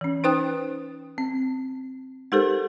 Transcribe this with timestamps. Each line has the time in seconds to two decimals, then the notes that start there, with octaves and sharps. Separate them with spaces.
0.01 E3 C#4
0.24 D#4 B4 C5 G5 D#6 F#6
1.18 C4
2.32 G#3 D#4 G4 A4 A#4 C5